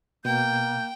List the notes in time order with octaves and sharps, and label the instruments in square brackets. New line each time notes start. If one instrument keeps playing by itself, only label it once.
[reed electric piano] B2 [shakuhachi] A#3 [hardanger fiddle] G5 [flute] G6